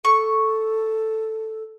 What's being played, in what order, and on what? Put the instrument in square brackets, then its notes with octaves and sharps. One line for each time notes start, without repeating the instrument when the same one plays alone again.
[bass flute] A4 [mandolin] C#6